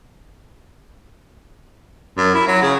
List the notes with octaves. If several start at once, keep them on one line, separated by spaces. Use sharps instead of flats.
F#2
E4
F#3
C#3